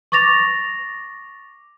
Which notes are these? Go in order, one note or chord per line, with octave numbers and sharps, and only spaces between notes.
C#6 D6 A6 A#6 F7